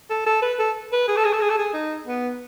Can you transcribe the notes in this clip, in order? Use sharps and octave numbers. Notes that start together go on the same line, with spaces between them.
A4
A4
B4
A4
B4
G#4
A4
G#4
A4
G#4
A4
G#4
D#4
B3